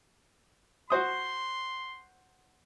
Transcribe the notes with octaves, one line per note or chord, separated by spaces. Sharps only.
F#4 C5 C6 D#6